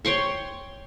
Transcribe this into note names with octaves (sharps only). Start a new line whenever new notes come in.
C#5 G5 C6 C#6